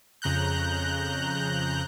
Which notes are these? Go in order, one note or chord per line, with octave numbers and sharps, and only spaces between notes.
F2 C#3 A#5 F#6 G6